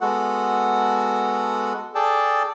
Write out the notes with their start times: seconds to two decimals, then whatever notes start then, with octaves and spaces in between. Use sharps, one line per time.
0.01 G#3 B3 F#4 A4 F#5
1.95 G#4 A4 D5 G5 A5